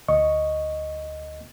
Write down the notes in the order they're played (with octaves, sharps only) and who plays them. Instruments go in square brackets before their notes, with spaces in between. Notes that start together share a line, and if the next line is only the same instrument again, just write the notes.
[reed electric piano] D2 D#5 C#6